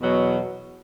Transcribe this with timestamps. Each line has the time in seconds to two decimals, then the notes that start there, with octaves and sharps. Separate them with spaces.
0.01 E2 B2 F#3